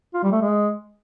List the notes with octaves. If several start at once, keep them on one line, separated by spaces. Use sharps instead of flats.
F4
G3
A3
G#3